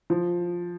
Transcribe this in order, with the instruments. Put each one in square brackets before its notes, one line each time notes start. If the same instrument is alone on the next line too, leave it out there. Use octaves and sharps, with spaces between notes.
[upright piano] F3